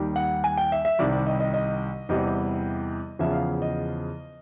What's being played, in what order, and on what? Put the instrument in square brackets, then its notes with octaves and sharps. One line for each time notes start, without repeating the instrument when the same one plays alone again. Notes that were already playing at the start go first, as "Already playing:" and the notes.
Already playing: [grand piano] D#2 D#3 G3
F#5
G#5
G5
E5
E5
C2 C3 D#3 G3 D5
D5
D#5
D#5
D#5
E2 C3 E3 G3 D#5
E2 C#3 F3 E5
F5
D#5